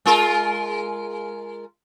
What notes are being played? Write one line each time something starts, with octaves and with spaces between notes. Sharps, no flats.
G#3 F4 A#4